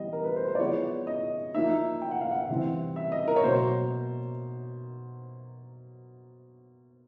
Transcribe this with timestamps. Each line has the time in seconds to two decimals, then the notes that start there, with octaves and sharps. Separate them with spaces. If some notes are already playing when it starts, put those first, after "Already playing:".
Already playing: E3 G3 B3 D#5
0.13 A#4
0.24 B4
0.36 C5
0.48 C5
0.55 D5
0.60 F3 G#3 B3 E4 C#5
1.07 D#5
1.55 F3 A#3 D#4 E5
2.02 G5
2.11 F#5
2.21 F5
2.31 F#5
2.49 C3 E3 G3 C4
2.96 E5
3.12 D#5
3.28 A#4
3.36 C#5
3.43 B2 F#3 A#3 C5